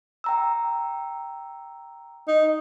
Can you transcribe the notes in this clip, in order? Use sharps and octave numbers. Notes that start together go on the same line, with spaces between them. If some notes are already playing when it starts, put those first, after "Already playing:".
G5 A#5 E6
D#4